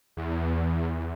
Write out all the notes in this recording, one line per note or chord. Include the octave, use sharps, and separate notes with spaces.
E2